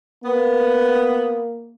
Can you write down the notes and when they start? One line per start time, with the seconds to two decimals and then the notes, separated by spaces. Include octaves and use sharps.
0.24 A#3 B3